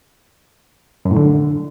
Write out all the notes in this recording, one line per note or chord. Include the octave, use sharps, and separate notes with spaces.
F#2
A2
D3